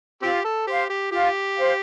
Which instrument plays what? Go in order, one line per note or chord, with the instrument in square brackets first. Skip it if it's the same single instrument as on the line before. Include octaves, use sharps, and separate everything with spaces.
[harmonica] C4 G4 [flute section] F4
[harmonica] A4
[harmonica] G4 [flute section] C5 F5
[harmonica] G4
[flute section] F4 [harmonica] G4
[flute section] C5 F5